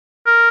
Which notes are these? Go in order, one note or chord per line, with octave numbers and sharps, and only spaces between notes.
A#4